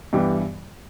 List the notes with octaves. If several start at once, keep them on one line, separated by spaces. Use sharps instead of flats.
G2 E3 G3 B3 G4